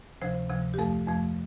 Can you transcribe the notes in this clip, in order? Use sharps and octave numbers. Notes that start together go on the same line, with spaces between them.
D2 C3 F3 C5
D2 C3 F3
G4
F2 F3 A3 A4
F2 F3 A3